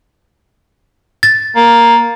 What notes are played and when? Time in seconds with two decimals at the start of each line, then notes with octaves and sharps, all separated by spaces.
1.23 A6
1.56 A#3